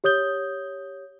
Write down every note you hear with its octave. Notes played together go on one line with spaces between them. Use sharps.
G4 C#5 D#6 G6 G7